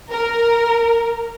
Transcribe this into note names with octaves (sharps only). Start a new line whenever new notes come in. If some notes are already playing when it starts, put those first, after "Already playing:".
A#4